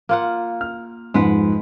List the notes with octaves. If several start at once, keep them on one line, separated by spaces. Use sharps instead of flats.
A#3 F4 F#5
F6
F2 G#2 G#3 B4 F#5